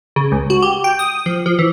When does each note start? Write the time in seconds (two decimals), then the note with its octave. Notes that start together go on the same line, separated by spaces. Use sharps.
0.16 C#3
0.32 C#2
0.50 F#4
0.62 G4
0.84 G5
0.99 D#6
1.26 F3
1.46 F3
1.59 E3